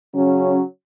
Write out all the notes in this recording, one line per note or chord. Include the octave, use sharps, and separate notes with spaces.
C#3 F#3 C#4